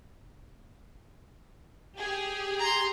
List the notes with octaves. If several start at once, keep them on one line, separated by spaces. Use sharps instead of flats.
G4 G#4
A#5 C6